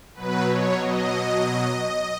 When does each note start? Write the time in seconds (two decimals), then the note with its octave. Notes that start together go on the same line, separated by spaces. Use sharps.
0.14 B2 F#3 B4
0.46 C#5
0.77 D#5